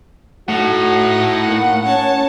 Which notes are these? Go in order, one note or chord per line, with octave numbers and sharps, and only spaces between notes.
A2 D#4 F#4 F#5
A#3
C#4 C#5 A5